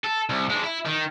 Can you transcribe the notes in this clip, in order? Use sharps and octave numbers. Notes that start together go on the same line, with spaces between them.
A4
C2
G#3 D4
E4
D#3